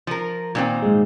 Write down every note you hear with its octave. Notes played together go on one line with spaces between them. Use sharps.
F3 A#4
A#2 D#3 C4
G#2 G#3